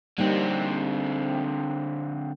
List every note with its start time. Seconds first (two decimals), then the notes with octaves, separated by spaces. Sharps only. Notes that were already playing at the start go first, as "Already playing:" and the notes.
0.18 D3 G3 A#3 C4 D#4